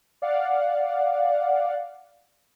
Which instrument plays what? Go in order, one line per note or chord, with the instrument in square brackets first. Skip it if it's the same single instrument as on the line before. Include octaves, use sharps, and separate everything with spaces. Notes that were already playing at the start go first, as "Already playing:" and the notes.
[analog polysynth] D5 F5 F#5